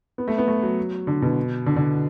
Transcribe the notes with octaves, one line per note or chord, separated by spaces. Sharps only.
B3
A3
B3
A3
F#3
D3
B2
D3
D3